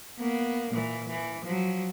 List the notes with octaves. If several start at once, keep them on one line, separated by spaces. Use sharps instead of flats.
A#3 B3
A#2 E3
E3
F3 F#3